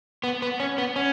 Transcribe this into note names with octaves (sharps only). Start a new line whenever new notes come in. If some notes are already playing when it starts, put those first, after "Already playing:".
B3
B3
C#4
B3
C#4